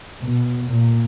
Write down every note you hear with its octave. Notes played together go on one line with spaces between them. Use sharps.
B2
A#2